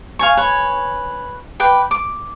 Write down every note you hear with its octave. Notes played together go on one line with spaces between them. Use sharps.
F5 G#5 C#6
B4 C#5 G#5
B4 G5 D6
D6